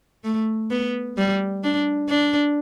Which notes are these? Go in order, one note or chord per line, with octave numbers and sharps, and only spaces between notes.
A3
B3
G3
D4
D4